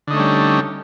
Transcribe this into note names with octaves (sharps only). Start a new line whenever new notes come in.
D3 G3 A3 C#4 D#4